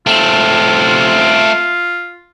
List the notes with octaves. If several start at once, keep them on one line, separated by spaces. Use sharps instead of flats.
A3 C4 F4